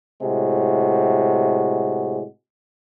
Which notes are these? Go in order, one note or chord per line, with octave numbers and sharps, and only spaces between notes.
A2 C3 G#3 F#4